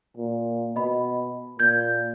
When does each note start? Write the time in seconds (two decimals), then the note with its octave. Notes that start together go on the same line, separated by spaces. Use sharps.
0.17 A#2
0.76 B2 D#5 B5
1.59 A#2 G6 G#6